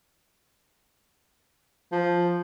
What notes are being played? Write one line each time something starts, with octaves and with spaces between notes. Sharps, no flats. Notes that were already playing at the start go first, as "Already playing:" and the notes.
F3